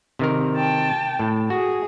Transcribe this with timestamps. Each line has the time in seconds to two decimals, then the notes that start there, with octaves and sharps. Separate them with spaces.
0.19 C3 D#3 A#4
0.56 G5 A5
1.19 A2
1.50 F#4 G#4